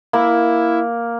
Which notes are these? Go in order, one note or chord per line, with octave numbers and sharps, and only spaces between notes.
A#3 E4